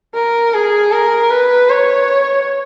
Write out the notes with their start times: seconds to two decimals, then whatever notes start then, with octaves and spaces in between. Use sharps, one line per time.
0.15 A#4
0.54 G#4
0.92 A#4
1.31 B4
1.70 C#5